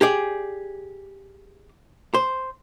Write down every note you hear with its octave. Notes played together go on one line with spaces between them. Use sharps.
G4 G#4 D5
C5